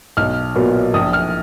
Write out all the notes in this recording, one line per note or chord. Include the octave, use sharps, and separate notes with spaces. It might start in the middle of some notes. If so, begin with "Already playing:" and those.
B1 F6
A#2 F#3 B3
A#1 D#6
F6